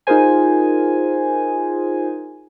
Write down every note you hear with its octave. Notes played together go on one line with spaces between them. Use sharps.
D#4 F4 G#4 A#4 C5 G#5